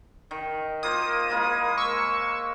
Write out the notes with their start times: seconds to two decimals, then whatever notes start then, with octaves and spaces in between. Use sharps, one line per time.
0.31 D#3
0.83 A#3 F4 C5 D#6
1.30 G#3 A#3 E4
1.78 C#6 E6